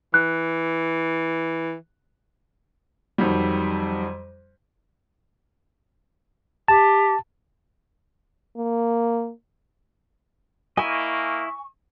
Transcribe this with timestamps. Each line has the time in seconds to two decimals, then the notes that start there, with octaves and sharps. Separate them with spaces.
0.14 E3 F#6
3.18 F2 D#3 F#3 G3
6.68 G4 A5
8.57 A#3
10.77 A#3 E4 D#5 G#5 C#6